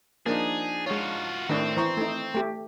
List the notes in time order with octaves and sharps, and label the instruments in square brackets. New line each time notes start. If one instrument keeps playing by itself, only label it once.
[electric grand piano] F3 D4 D#4 [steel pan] A#3 [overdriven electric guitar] G#4
[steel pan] G#3 C#5 [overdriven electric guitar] F4 F#4
[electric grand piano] A2 A3 [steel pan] D#3 D4 [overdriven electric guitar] C4
[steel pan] E3 [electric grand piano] C5 A#5 C#6
[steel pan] A3 D#4
A3 G4